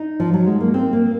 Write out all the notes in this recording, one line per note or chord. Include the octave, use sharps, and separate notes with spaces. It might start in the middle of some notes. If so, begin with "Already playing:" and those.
Already playing: D#4
F3
F#3
G#3
A#3
C4
A#3